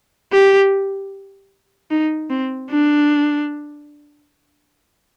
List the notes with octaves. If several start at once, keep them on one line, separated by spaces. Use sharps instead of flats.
G4
D#4
C4
D4